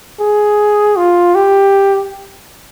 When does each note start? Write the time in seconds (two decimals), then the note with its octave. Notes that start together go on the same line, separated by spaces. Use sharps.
0.20 G#4
0.96 F4
1.35 G4